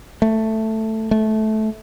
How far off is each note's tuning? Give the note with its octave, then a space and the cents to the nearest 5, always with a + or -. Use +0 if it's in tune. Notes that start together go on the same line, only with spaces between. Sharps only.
A3 +5
A3 -15